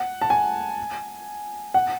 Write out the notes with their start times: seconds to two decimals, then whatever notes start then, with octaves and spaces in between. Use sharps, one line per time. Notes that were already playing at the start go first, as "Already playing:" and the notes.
Already playing: F#5
0.21 A5
0.30 G#5
1.74 F#5